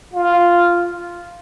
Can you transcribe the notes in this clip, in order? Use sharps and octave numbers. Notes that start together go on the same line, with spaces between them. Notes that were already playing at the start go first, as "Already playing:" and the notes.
F4